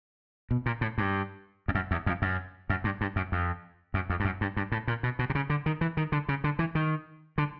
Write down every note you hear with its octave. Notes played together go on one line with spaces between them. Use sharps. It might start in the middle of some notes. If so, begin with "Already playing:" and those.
B2
A#2
A2
G2
F2
F#2
E2
F2
F#2
F#2
G2
G2
F#2
F2
F#2
F2
G2
F#2
G2
G2
A2
A#2
B2
B2
C3
C#3
D3
D#3
E3
D#3
D3
C#3
D3
E3
D#3
D3